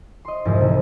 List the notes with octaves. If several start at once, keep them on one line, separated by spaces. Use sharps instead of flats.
D#5 C6
C2 F2 G#2 E3
C3 E3 G3